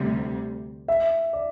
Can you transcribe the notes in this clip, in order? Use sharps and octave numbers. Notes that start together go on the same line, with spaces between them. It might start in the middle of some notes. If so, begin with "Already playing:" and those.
Already playing: D2 C3 G3
E5
D5